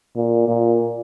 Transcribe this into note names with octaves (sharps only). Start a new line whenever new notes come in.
A#2
A#2